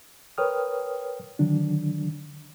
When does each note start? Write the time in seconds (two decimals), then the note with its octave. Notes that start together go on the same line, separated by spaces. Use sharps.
0.38 A#4 B4 C#5 G5 D#6 F6
1.39 D3 D#3 F#3 D4